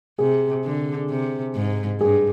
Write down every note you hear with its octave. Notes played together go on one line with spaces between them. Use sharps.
C3 G#4
D3
C3
G#2
G2 G#4